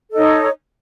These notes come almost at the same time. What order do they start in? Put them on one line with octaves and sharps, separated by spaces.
A4 D#5 D#4 C#5